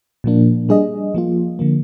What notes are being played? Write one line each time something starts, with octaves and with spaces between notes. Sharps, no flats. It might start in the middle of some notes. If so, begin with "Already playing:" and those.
A#2 F3 A#3 D4
G3 D4 G#4 D#5
F3 A#3 F4
D3 F3 A#3